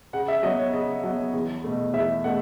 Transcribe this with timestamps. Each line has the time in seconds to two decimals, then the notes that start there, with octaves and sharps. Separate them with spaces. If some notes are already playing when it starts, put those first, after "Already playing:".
0.13 C#3 F#5
0.28 E5
0.43 F#3 B3 D#5
0.59 C#5
0.73 C#3 D#5
1.04 F#3 B3
1.34 E2
1.64 B2 A3
1.94 E2 E5
2.24 B2 A3 F#5